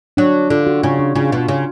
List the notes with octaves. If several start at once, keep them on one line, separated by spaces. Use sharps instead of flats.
F#3 D4
D3 F4
F#4
C#3 F4
D4
C#3 F4
B2 F4
C#3